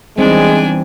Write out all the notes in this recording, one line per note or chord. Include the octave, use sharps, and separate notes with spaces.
E2 G3 G#3 C4 D4 D#4 G#5